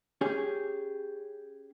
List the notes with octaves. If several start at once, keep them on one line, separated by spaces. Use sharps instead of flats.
C#4 G4 G#4